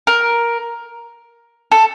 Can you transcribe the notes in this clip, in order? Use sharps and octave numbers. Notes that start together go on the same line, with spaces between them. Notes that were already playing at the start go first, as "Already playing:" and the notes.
A#4
A4